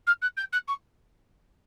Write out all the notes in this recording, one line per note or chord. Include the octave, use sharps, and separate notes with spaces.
F6
F#6
G6
F#6
C#6